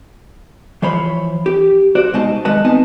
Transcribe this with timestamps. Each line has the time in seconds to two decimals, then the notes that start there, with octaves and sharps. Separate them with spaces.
0.82 E3 F3 C5 C#5 B5
1.46 G4
1.95 F#4 C5 D5
2.14 B2 G#3 D#4 C5 D#5 A5
2.45 D#3 G#3 B4 D#5 A5
2.65 B3 C4 D#4 D#5 G#5 A5